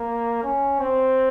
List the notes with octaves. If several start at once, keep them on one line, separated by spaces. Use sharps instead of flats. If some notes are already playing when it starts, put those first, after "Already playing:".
Already playing: A#3
C#4
C4